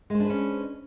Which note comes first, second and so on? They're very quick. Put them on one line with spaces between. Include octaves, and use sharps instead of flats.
G#3 C5 D4 B4 C#4